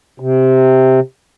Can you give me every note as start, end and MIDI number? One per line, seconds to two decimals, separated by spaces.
0.20 1.00 48